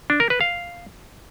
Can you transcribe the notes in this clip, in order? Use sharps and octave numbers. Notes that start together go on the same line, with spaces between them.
D4
A#4
B4
F5